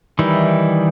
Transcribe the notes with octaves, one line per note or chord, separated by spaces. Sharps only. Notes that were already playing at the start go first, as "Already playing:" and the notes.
D#3 E3 G3 D#4 E4